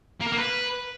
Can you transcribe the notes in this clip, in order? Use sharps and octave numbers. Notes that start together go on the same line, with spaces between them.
A#3
A#4
A#3
B4